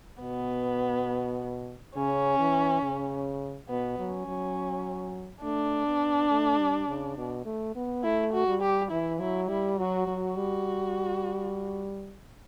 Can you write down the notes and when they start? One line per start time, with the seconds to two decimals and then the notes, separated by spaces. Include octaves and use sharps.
0.22 B2 B3
1.95 C#3 C#4
2.39 E3
2.82 C#3
3.69 B2 B3
3.99 F#3
4.13 C#4
4.28 F#3
5.43 A3 D4
5.87 B3
6.30 A3
6.59 G3
6.88 C#3
7.17 B2
7.46 A3
7.76 B3
8.03 A3 E4
8.33 F#4
8.48 G3
8.62 G4
8.91 E3 E4
9.20 F#3 E4
9.48 G3 E4
9.78 F#3 F#4
10.07 F#3
10.21 F#4
10.36 G3